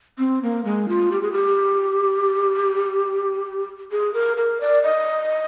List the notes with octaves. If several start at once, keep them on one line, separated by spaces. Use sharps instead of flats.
C4
A#3
G#3
F4
G4
G#4
G4
G#4
A#4
A#4
D5
D#5